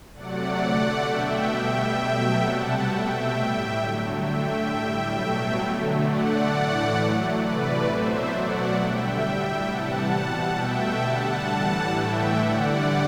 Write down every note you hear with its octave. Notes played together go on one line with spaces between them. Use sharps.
C3 F#3 A3 D5 F#5
D3 A3
B2 A3 E5 G5
B2 G3 E5 G5
B2 F#3 A3
C3 G3 F#5 A5
B2 A3 E5 G5
A2 G3
D3 F#3 A3
D3 A3 E5 G5
A2 G3
B2 F#3 A3
D3 F#3 A3
D3 A3 D5 F#5
A2 E3 A3
A2 F#3 A3
C3 E3 A3 B4 D5
B2 F#3 A3 C5 E5
B2 F#3 A3 D5 F#5
D3 G3 E5 G5
A2 G3
C3 E3 G3 F#5 A5
B2 G3
B2 A3 E5 G5
D3 G3 F#5 A5
A2 E3 G3 F#5 A5
A2 E3 A3 E5 G5
D3 G3 D5 F#5